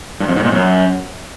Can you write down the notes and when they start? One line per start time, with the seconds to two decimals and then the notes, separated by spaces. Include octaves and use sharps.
0.20 G2
0.28 F2
0.36 G#2
0.44 A#2
0.52 F#2